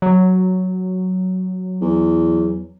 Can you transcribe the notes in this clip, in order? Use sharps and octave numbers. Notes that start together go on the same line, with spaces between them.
F#3
E2